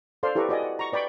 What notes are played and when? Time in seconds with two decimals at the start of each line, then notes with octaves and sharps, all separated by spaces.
0.23 A4 C5 D5 F5 C6
0.35 E4 G4 A4 B4 A#5 C#6
0.49 F#4 D5 D#5 G#5
0.63 F#5
0.79 A#5 C#6
0.93 B4 D5 G5 B5 C#6